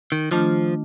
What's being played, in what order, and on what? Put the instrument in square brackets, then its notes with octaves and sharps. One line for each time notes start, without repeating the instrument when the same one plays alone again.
[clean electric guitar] D#3
[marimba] D#3 A3 D4 F4 [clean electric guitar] F3